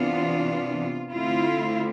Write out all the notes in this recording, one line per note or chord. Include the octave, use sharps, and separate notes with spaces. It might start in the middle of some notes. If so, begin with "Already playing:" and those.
Already playing: C3 E3 B3 D4 F4
D3 A3 C4 E4 F4